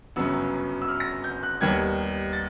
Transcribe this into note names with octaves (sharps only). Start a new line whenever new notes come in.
G1 F#2 C#3 F#3 B3 E6
E6
F6
A#6
G6
F#6
D#2 D#3 G3 B3 G#6
A6